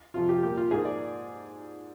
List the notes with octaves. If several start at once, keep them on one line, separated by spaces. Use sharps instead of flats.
F2 C3 F3 C4 F4
G4
A#2 G3 A#3 G4
F4
G#2 F3 A#3 G#4
D5